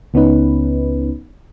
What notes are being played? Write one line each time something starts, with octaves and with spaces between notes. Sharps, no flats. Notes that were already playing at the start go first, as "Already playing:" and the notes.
C#2 B3 C#4 D#4 B4